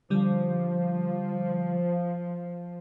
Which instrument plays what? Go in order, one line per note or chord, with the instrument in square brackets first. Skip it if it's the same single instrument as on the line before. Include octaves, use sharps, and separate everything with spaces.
[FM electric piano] D3 G3 [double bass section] F3